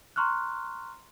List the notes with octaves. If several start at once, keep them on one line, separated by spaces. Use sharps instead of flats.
A#5 C6 C#6 F6 F#6